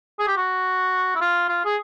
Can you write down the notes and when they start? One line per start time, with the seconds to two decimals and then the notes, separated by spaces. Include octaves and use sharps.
0.19 G#4
0.27 G4
0.37 F#4
1.15 E4
1.21 F4
1.48 F4
1.65 G#4